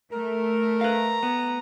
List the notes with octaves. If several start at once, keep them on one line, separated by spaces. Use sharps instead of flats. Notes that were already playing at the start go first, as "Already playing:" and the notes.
A3 A#4
B4 F5 A#5
B3